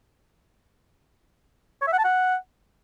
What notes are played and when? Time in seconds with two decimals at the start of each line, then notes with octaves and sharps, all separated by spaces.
1.82 C#5
1.87 E5
1.93 F#5
1.99 A5
2.04 F#5